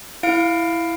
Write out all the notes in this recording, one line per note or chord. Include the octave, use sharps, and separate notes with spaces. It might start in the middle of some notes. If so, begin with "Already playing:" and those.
E4 F5 D7